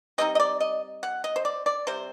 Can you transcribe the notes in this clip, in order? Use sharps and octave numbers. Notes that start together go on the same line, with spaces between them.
G3 C4 D#4 D#5
D#5
D5
D#5
F#5
D#5
C5
D5
D5
C3 G3 C5